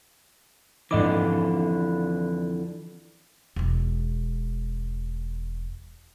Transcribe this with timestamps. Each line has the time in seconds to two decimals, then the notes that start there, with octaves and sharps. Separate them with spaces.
0.91 F2 G#2 D3 E3 D#5 D6
3.56 E1 G#3